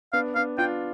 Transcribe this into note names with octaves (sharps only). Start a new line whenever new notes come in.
B3 D4 F5
B3 D4 F5
D4 F4 G5